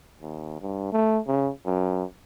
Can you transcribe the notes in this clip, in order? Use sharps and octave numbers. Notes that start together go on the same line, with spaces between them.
D#2
G2
A3
C#3
F#2